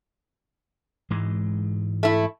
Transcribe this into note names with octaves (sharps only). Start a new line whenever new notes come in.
G#2 E3 G#3
A3 E4